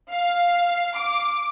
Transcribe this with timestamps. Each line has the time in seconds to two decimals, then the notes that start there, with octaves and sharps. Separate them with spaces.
0.11 F5
0.95 D6